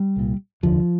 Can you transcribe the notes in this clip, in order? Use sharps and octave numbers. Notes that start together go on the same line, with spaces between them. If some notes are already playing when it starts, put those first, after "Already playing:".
Already playing: G3
C2 A#2
F1 D#2 D3 F3